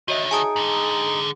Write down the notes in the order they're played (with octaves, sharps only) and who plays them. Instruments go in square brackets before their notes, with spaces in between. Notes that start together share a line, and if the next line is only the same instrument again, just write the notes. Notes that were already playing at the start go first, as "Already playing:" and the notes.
[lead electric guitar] D3 D#3 [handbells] F#4 C#5 E5 [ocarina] D#5
[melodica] D#4 [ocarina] G#4 [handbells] G#5 A5 D#6
[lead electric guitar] G#2 D3